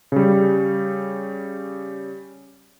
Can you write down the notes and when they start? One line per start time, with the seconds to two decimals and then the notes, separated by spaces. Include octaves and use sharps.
0.12 C#3 G3